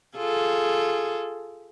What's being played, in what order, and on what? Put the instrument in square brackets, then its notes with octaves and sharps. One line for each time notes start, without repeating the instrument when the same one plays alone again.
[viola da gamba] F4 G#4 A4